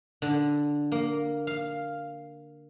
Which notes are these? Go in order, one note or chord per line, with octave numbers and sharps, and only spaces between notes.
D3
A#3
F5